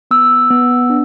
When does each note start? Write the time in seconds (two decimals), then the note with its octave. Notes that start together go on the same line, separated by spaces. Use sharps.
0.11 B3 E6
0.50 B3
0.90 D4